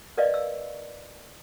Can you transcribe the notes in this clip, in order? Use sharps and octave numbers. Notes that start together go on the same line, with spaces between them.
A#4 B4 D5 D#5 F5
E6